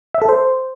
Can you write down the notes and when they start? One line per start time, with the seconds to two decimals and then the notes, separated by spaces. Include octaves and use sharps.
0.14 E5
0.22 A4
0.29 C5